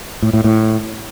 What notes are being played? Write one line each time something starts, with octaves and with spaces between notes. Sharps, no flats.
A2
A2
A2